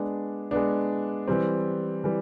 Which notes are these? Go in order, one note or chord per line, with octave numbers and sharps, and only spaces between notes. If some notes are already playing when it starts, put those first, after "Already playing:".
Already playing: G#3 B3 D4
G#3 B3 D4
E3 G3 C4
E3 G3